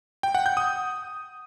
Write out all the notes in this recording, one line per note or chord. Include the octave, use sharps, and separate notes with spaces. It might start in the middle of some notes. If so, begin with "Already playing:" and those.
G5
F#5
G6
D#6